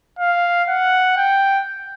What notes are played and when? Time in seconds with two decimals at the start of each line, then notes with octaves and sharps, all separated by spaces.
0.19 F5
0.68 F#5
1.17 G5